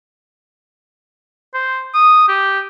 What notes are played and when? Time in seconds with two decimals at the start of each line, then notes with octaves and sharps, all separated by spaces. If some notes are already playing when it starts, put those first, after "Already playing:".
1.54 C5
1.94 D#6
2.28 G4